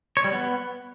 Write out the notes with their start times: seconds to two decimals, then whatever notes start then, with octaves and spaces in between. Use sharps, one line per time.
0.17 C#5
0.24 G3
0.32 B3